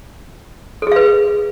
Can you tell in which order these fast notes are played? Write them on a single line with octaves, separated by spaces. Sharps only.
A4 G#4 F5 B4